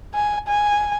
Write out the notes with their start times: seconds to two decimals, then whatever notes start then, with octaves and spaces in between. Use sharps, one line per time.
0.15 G#5
0.48 G#5